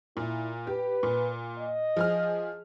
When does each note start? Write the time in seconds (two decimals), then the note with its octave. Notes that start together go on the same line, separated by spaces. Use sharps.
0.17 A#2 E4
0.67 G4 B4
1.03 A#2
1.59 D#5
1.96 F3 G#4 F6